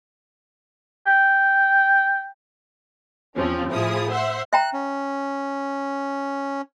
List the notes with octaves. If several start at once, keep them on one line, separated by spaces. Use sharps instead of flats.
G5
E2 F3 C4 C#4
A2 F3 E4 G#4 D#6
C5 E5 F#5 C6
E5 G5 A#5 F#6
C#4